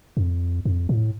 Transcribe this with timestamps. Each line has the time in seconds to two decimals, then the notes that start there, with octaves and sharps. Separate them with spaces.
0.17 F2
0.65 F2
0.89 A2